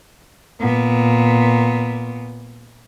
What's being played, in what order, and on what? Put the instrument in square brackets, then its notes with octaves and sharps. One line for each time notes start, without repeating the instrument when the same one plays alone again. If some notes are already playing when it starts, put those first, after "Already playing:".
[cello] A#2 B3